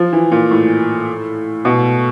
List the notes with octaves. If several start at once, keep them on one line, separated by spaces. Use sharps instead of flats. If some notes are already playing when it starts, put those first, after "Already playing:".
Already playing: F3
E3
A#2
A2
B2